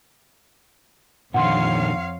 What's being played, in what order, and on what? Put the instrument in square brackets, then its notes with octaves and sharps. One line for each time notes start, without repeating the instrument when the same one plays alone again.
[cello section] F2 C#5 F5 [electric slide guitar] A#2 D3 D#3 [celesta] F#5 C6